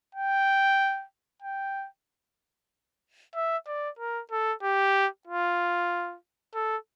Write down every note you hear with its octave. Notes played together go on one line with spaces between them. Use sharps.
G5
G5
E5
D5
A#4
A4
G4
F4
A4